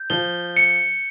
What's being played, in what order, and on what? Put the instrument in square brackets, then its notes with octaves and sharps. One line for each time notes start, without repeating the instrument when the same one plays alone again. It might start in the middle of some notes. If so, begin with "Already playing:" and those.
Already playing: [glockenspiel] G6
[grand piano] F3 [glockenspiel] G7
[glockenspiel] C#7